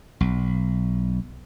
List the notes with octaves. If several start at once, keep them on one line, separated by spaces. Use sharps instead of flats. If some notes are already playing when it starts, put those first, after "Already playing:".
B1